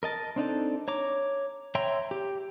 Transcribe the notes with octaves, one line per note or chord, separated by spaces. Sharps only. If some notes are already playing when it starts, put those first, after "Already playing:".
A#4 D#5 A5
C4 D4 D#4 A4
C#5 A#5 D6
C#5 E5 G5 A#5 C6
G4